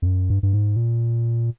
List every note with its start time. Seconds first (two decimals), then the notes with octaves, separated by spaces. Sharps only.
0.02 F2
0.06 F#2
0.30 G2
0.43 G2
0.53 G#2
0.76 A#2